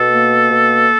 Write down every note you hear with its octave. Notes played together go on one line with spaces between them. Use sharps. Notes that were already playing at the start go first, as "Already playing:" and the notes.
Already playing: B2 A4
A#3
B2